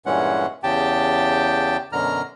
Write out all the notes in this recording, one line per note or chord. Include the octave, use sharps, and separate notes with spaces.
G2 A#2 E3 G#3 C#4 F#5
E2 C#3 G4 G5 A5
F#2 B2 D3 A#5 F6